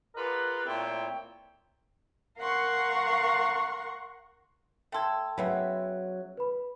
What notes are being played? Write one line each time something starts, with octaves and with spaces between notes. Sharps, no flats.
F4 G#4 A#4 B4 D5 F#5
A#2 A3 C4 E4 C#5 G5
A#4 F5 F#5 C6 C#6
A3 A4 G5 C6 G#6
C#3 F#3 B3 E5
B4 B5